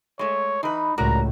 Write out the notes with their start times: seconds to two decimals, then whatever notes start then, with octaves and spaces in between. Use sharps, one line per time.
0.19 G#3 A3 C#5
0.63 E3 D#4 B4
0.98 C#2 A2 F#4 A#4 D5 A#5